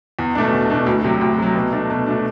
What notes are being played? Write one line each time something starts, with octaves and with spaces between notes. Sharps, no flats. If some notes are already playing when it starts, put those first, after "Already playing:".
E2
B2 A3 D4
E2
B2 A3 D4
D2
C3 F#3
D2
C3 F#3
B2
A3 D4
B2
A3 D4